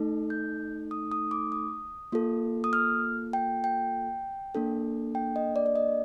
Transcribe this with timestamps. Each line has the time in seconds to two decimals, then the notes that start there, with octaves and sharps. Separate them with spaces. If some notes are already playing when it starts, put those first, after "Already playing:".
Already playing: A3 D#4 A4
0.30 G6
0.91 D#6
1.12 D#6
1.31 D6
1.52 D#6
2.12 A#3 F4 A4
2.64 D#6
2.73 F6
3.33 G5
3.64 G5
4.55 A#3 D4 A4
5.15 G5
5.36 D#5
5.56 D5
5.66 D5
5.76 D#5